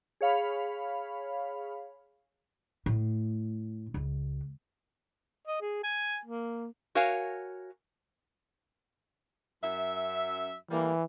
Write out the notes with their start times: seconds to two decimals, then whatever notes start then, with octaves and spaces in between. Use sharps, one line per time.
0.21 G#4 C#5 F5 B5
2.86 A2
3.94 C#2
5.47 D#5
5.61 G#4
5.83 G#5
6.25 A#3
6.95 F#4 A#4 C#5 F5 G#5
9.64 F#2 E5
10.71 A2 E3 G3 A#3